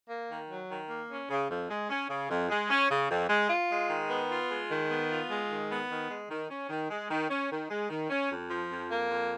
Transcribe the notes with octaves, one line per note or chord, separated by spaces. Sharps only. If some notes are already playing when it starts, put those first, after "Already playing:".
A#3
D#3
F#3
D#3
A#3
C#4
C#3
F2
G#3
C#4
C#3
F2
G#3
C#4
C#3
F2
G#3
F4
G#3
D#3
B3
F4
G#3
D#3
B3
F4
G#3
D#3
B3
D#3
G#3
D#3
C#4
D#3
G#3
D#3
C#4
D#3
G#3
D#3
C#4
F2
F3
F2
A#3
F2